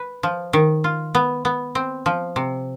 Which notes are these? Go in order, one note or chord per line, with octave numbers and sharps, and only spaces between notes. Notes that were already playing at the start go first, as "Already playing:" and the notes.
Already playing: B4
F3
D#3
F4
B3
B3
C4
F3
C3